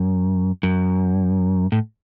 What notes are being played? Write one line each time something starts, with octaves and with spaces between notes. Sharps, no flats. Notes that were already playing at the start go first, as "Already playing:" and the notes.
Already playing: F#2
F#2
A2